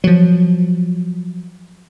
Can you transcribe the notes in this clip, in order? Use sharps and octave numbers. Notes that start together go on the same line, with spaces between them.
F3 F#3